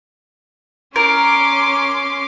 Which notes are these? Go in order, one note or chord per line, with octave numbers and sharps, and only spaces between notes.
C#4 A#4 C6 D6